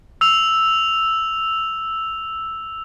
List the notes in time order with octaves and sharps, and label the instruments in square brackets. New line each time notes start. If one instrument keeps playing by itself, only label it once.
[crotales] E6 F7